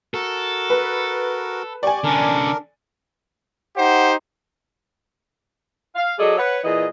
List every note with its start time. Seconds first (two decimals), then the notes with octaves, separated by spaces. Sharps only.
0.14 F#4 A4 A#4
0.70 B4
1.83 G4 D5 G#5 C#6
2.04 D3 C#4 D4 A#4
3.76 D#4 G4 C5 F#5
5.95 F5
6.19 F#3 G#4 A4 D5 D#5
6.37 B4 C#5 F#5
6.64 A#2 E3 G#4 D#5